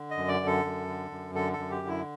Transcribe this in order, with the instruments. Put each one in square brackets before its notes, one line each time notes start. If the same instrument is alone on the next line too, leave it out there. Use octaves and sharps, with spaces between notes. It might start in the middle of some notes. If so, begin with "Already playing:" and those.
Already playing: [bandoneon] D3
D#5
F#2
D5
D3
A4
F#2
D3
F#2
D3 A4
A4
F#2
G4
D3
E4